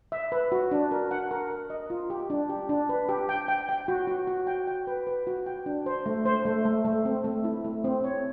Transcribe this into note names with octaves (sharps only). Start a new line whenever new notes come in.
E5
B4
F#4
D4
A#4
F#5
A#4
A#4
D#5
F4
G4
D4
G4
D4
B4
G4
G5
G5
G5
F#4
F#4
F#4
G5
G5
B4
B4
F#4
G5
D4
C5
A3
C5
A3
A3
A3
C4
A3
E4
A3
C4
C#5